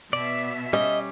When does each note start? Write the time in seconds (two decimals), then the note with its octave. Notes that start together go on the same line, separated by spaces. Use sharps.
0.13 B2 D5 E5
0.73 G3 C#4 D#5